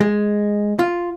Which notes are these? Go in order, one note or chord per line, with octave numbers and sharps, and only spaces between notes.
G#3
F4